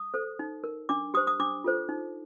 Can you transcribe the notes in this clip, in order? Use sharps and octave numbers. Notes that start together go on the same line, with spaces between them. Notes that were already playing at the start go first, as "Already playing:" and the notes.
Already playing: D#6
A4 C5
D#4
A#4
D4 D6
G4 C5 D#6
D#6
D4 D6
F4 A4 C5
D#4